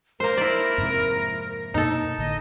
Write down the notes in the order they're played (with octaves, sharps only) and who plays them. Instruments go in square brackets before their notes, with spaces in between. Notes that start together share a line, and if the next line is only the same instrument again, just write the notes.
[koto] A#3 C5 [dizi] A#4
[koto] E4 D5
[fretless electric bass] F2 G#2 C3
[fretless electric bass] F#2 B2 A#3 [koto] D#4 A4
[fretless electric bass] G#1 A2 D3 [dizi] D#5